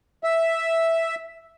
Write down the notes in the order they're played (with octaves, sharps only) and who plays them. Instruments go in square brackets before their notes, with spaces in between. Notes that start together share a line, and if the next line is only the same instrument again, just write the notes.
[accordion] E5